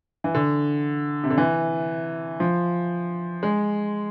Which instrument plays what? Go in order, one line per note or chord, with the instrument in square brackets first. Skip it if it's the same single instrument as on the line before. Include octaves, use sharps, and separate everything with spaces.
[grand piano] E3
D3
C3
D3
E3
F3
G#3